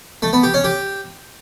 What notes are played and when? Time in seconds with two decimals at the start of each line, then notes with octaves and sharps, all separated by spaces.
0.22 A3
0.33 B3
0.43 G4
0.54 C#4
0.64 G4